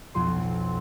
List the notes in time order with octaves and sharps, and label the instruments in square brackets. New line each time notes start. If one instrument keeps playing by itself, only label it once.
[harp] B1 F2 C6